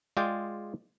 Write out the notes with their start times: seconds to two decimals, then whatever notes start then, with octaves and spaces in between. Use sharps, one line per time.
0.17 G#3 F4 G#4 D5 G5